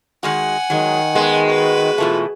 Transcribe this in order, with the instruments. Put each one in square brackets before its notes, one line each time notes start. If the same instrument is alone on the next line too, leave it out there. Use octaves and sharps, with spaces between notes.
[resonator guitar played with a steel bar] D#3 G#3 F#4 [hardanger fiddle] F#5 G#5
[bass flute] D#3 [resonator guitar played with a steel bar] F#3 G#3
[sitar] G#3 [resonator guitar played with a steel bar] B3
[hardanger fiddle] F#4 B4
[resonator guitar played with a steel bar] B2 E3 A3 [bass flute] F4